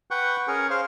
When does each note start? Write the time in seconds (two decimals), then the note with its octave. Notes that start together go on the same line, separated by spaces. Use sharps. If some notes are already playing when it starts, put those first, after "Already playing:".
0.11 B4 F#5 G5 C#6
0.48 C#4 G#4 A#4 C#6
0.70 C5 F5